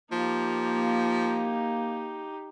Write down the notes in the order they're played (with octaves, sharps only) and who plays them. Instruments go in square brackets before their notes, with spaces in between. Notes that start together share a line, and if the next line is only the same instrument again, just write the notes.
[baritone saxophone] F3 [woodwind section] A#3 [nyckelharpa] D#4 G4